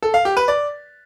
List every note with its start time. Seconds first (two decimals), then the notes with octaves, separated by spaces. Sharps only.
0.03 A4
0.14 F5
0.25 G4
0.37 B4
0.48 D5